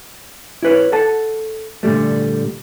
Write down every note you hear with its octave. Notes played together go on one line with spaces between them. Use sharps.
E4 B4 C#5
A4 F#5 A5
A#2 D3 E3 G3 A3